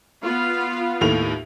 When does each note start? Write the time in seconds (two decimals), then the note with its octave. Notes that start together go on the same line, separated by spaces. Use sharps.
0.24 B3 F4 F5
1.01 D#2 A2 F7